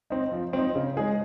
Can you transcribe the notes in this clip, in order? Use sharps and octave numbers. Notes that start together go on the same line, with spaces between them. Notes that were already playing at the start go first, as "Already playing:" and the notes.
C4 D#4
F3
C4 D#4
C#3
G#3 D#4 G#4